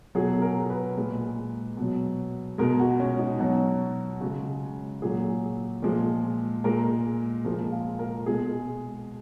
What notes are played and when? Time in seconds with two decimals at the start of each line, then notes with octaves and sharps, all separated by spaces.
0.15 B2 F#3 G#4
0.42 A#4
0.70 B4
0.97 A#2 G#3
1.77 B2 F#3
2.58 B2 G#3 A#4
2.79 F#4
3.00 C#4
3.19 D#4
3.39 B2 F#3 F#4
4.21 C#3 G#3
5.02 A#2 F#3 G#4
5.82 A#2 F3 G#3
6.64 A#2 G#3 A#4
7.45 A#2 F3 G#3 A#4
7.72 F5
7.99 A#4
8.26 B2 G#3 G#4